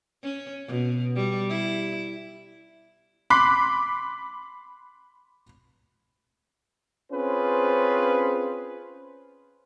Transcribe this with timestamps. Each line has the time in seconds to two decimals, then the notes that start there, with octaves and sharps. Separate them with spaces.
0.23 C#4
0.68 B2
1.15 G3
1.50 E4
3.30 B5 C6 D6 F#6 B6 C7
7.12 C4 C#4 F4 G#4 B4 C5